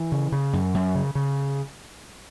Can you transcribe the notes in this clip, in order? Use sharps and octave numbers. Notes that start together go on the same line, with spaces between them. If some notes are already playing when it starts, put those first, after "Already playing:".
Already playing: E3
C#3
C#3
F#2
F#2
C#3
C#3